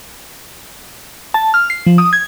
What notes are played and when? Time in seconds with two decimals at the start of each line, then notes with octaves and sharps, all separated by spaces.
1.34 A5
1.54 F6
1.70 C7
1.87 F3
1.98 D#6
2.13 G#6